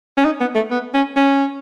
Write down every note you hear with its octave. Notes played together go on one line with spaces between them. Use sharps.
C#4
D#4
B3
A3
B3
C#4
C#4